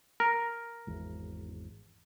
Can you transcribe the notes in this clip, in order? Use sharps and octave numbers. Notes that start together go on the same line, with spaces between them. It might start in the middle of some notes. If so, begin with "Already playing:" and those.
A#4
G#1 E2